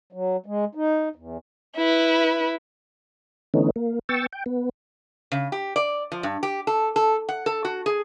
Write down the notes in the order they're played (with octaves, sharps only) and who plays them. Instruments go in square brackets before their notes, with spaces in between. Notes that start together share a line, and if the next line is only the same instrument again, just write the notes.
[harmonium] F#3
G#3
D#4
E2
[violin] E4 B4
[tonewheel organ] D3 E3 A3 B3 C#4 D#4
A#3
B3 G5 C#6 E6 A6
G5
B3
[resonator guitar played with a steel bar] C#3
G4
D5
F3
G2
G4
A4
A4
F#5
A4
F#4
G#4